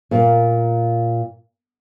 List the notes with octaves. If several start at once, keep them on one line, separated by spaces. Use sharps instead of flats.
A#2 A#3